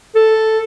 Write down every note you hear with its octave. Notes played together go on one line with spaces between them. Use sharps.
A4